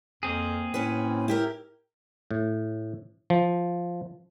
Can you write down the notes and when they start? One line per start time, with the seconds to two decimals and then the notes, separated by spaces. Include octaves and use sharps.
0.23 F2 A#3 C4 G#4
0.74 A2 C#4 B4
1.28 E4 G4 A#4
2.31 A2
3.30 F3